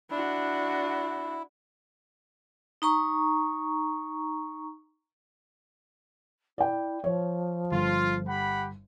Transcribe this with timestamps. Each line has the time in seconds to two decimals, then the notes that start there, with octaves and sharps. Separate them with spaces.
0.10 D4 E4 F#4
2.82 D#4 A#5 C#6
6.58 E4 D5 G5
7.04 F3 C#5
7.72 G1 F4
8.28 G4 F#5 B5